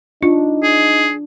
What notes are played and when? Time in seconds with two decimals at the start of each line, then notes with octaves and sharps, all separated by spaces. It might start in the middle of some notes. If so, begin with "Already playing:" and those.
0.23 D4 D#4 F4
0.63 G#4